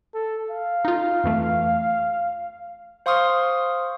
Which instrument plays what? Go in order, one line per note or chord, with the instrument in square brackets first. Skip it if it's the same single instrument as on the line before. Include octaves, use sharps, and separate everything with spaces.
[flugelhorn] A4
F5
[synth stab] D#4 F4
F2 E3 A3
[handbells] C5 F5 C6 C#6 D#6 F6